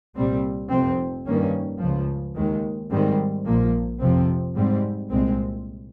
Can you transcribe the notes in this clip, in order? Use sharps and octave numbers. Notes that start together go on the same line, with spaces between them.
C2 A#2 G3 C4
F1 F2 C3 F3 C4
G2 D#3 A#3 C#4
C#2 C#3 F3
D#2 D#3 G#3
G#2 D#3 G3 C4
A#1 A#2 F3 A#3
F2 C3 F3 C4
G#2 G3 C4
C2 A#2 G#3 C4